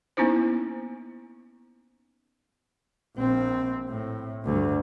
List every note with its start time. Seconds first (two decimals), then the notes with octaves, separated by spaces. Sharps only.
0.17 A#3 B3 C#4 D#4 E4 C5
3.17 A#1 C4
3.89 A2
4.44 D2 G2